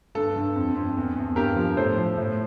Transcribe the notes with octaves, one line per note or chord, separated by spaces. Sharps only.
G2 A4
G2
F2
F2
E2
E2
G2 G4 A#4
F3
A2 A4 C5
F3
A2